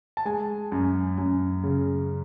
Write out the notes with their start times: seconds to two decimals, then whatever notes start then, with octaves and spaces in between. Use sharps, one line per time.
0.17 A5
0.25 G#3 G#5
0.72 F#2
1.18 F#2
1.63 C#3